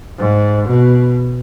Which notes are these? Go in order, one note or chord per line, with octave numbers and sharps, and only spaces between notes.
G#2
B2